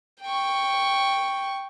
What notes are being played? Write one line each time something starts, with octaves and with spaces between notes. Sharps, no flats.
G5 C#6